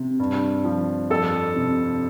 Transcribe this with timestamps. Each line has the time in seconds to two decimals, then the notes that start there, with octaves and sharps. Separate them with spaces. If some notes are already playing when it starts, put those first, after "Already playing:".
Already playing: C3
0.20 G2
0.65 F3
1.10 F2 A4
1.56 C3